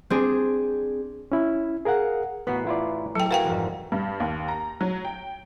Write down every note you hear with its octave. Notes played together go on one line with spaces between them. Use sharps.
C4 D4 G#4
C#4 E4
G#4 A#4 F5 F#5
A1 B3 F#4 B6 C7
E4 F4 D5
F#3 A4 G5
F#4 G#4 A#4 B4 F5 G5 G#5
E1 F2 G#2
G2
D#2
A#5
F#3
G5